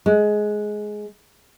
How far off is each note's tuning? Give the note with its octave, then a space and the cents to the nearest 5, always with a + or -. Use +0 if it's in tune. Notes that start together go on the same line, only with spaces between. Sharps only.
G#3 +15